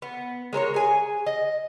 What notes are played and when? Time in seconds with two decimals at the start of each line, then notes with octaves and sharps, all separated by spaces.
0.02 B3
0.53 G#3 A#4 C5 C#5
0.74 G#4 G#5
1.26 D#5